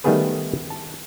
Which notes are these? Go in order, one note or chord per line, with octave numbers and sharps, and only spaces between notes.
D#3 G3 A3 B3 G#4 B4
A5